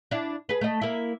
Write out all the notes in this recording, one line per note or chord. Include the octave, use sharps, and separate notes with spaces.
D4 E4
G#4 B4
A3 D#5
A#3 E4